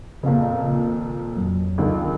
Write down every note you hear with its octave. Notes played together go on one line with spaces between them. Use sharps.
F2 A#2 C#3 F5
G#1
F2 F#3
C#2 D3 D#3